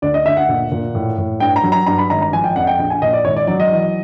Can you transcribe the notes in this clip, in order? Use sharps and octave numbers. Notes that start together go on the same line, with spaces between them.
D2 D5
D#5
D2 E5
F#5
A#2
A#2
A2
A2
G2 G5
A#5
F#3
A#5
G2 A#5
B5
G#1 A#5
A#5
F3 G#5
G5
F2 F#5
G5
A#1 G5
G#5
A#2 D#5
D5
G#1 C#5
D5
F#3 D5
D#5
E3